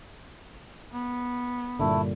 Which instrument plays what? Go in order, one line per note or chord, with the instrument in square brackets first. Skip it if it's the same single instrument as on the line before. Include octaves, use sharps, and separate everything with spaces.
[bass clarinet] B3
[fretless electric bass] G2 A#2 D3 [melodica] A3 E4